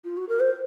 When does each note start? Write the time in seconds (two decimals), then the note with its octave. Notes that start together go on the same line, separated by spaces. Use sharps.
0.05 F4
0.17 F#4
0.29 A#4
0.40 C5